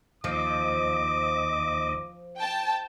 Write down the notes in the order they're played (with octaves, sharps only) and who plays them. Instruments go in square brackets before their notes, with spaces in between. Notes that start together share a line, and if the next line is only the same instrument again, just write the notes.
[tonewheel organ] D#2 D#5 [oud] F3 [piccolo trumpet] D6
[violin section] G5 A5